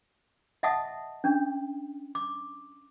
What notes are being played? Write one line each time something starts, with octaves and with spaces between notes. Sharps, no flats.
D#5 E5 F#5 A5 D#6
C#4 D4
D6